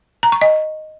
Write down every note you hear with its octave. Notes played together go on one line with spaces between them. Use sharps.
A#5
C#6
D#5